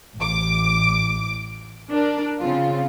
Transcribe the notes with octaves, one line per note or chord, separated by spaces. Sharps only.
A1 D6
D4 A#4 D5
C#3 C4 F4